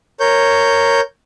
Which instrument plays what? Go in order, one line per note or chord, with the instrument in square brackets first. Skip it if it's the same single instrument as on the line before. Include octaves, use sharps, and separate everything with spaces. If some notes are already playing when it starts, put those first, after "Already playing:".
[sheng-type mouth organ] A#4 C#5 G6